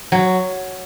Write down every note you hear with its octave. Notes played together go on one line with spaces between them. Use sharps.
F#3